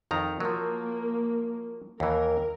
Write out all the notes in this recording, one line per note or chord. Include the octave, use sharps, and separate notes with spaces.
F2 D#3 A#5
F3 F#3 A#3
D#2 E3 A#4